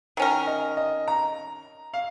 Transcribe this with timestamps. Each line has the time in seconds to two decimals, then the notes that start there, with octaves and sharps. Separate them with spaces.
0.17 D#3 C#4 A#4
0.47 D#5
0.77 D#5
1.08 A#5
1.94 F5